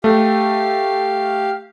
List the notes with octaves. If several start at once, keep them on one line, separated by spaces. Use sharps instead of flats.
A3 G4 F5